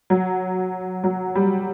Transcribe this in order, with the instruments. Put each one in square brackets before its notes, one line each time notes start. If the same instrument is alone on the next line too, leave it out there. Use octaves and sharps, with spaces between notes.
[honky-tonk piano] F#3
F#3
G3